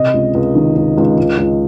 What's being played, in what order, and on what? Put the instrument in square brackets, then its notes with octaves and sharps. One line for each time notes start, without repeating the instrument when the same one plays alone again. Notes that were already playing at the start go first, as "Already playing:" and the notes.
Already playing: [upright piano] C3 D#5
C#2
C#2
D#3
C#2
C#2
C#2
C#2